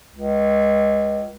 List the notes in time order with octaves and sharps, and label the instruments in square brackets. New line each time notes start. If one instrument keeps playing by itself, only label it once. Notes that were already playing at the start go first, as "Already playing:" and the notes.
[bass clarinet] C#2